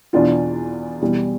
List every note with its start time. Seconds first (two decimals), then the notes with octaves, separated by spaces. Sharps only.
0.13 E2 B2 B3 D4 F4
1.01 E2 B2 G3